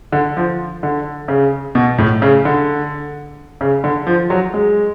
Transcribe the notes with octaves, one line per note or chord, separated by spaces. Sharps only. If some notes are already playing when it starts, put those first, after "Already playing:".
D3
F3
D3
C#3
B2
A2
C#3
D3
C#3
D3
F3
F#3
G#3